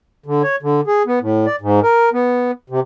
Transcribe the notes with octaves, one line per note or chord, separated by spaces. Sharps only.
D3
C#5
D3
G#4
B3
A2
D5
G#2
A#4
B3
C3